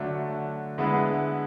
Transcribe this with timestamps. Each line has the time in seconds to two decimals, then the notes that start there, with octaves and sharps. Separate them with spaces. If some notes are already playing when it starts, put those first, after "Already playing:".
Already playing: D3 F#3 A3 D4
0.78 D3 G#3 B3 E4 B4